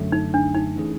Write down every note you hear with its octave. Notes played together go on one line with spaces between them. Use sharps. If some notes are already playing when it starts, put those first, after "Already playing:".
Already playing: F#2 D3 F#3 A3 D4
D#4
D4
D#4
E3 A3 C#4 E4 G#4